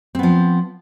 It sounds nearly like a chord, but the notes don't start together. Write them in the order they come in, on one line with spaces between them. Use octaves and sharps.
C4 B3 F3